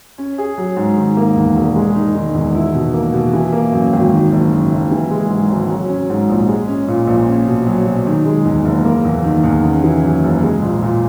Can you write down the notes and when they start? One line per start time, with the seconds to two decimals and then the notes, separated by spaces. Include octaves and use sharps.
0.18 C#4
0.38 G#4
0.58 F#3
0.76 G#2
0.97 D#3
1.17 A#3
1.36 E2
1.56 E1
1.75 G#3
1.95 D#4
2.15 D#3
2.34 E2
2.54 E4
2.74 B2
2.94 A#3
3.13 B2
3.33 E3
3.53 A#3
3.73 F#2
3.93 G#1
4.13 D#3
4.31 F#1
4.51 F#2
4.71 F#1
4.91 E3
5.10 G#3
5.30 G#2
5.50 G#1
5.70 F#3
5.89 C#4
6.10 G#2
6.29 A#1
6.48 G#3
6.68 C#4
6.88 A#2
7.07 A#1
7.27 C#4
7.47 B2
7.67 F#3
7.86 B2
8.06 D#3
8.25 G#3
8.45 E2
8.65 F#1
8.85 A#3
9.05 E2
9.24 D#3
9.44 E2
9.64 C#3
9.83 E3
10.03 F#2
10.23 F#1
10.43 G#3
10.62 A#1
10.82 A#2